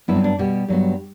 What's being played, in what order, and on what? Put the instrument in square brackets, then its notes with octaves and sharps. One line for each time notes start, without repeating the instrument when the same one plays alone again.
[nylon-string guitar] G2 F#3 B3 E4
C4
D4
B2 G3 B3 G4
G2 F#3 B3